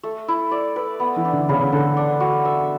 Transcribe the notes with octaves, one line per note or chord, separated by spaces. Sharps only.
A3
E4
D5
B4
B3
E3
D4
D3
C#3 B3
C#3
D3 A4
D4
F#4
E5